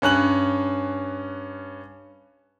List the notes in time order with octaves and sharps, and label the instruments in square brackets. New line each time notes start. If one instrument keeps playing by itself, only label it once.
[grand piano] G2 C#4 F#6 F#7